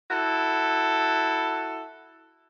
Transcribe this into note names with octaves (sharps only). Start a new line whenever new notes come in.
E4 F#4 A4